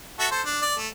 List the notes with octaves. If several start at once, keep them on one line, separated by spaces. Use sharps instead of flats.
F#4 A4 E5
A4 C5
D4
D5
A3